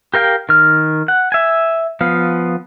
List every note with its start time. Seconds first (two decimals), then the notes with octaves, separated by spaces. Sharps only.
0.14 G4 A#4 F5 G5
0.49 D#3 F6
1.08 F#5
1.32 E5 G#5
2.01 F3 B3 F5